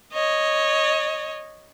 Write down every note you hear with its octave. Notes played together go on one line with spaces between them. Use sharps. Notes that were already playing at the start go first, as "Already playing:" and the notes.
C#5 D#5